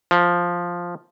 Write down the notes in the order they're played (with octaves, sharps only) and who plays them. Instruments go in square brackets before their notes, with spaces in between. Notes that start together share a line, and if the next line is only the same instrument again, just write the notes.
[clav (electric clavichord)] F3